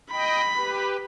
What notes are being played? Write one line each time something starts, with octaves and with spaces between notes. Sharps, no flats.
D#5 G5 B5
G4 B4